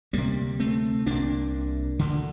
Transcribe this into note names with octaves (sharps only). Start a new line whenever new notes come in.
D2 C3 G3 A#3
A3 C4
C2 C3 A#3 D4
D2 D3